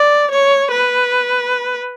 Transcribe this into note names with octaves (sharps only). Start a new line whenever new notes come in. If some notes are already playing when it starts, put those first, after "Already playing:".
Already playing: D5
C#5
B4